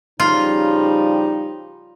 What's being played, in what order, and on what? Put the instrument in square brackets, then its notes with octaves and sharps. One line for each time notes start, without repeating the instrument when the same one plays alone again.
[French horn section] C#3 F3 G3 [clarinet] D#4 [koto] F4